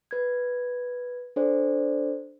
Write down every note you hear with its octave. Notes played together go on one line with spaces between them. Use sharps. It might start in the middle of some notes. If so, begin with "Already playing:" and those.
B4 G#6
D4 A4 C5 D5